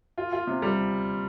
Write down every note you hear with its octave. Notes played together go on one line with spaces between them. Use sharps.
F4
F4
C3
G3